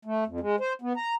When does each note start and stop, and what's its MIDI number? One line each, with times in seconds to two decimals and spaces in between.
0.05 0.24 57
0.27 0.40 41
0.40 0.56 56
0.60 0.73 72
0.82 0.93 59
0.97 1.15 82